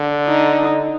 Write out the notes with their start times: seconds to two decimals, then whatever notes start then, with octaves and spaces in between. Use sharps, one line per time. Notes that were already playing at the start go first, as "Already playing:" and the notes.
Already playing: D3
0.27 D#4